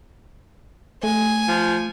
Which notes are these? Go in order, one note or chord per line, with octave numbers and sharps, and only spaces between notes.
A3 G#5
F3